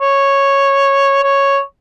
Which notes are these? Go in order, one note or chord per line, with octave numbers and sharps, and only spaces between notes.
C#5
C#5